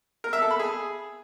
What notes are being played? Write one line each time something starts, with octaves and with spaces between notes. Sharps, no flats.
A#4
E5
A4
B5
G#4